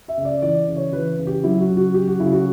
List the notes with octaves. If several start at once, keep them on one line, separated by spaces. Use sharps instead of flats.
E5
C#3
D5
E3 D5
C#3
C#5
E3 B4
C#3
G4
F#3 E4
F#4
C#3
F#4
F#3 G4
F#4
C#3 E4
F#4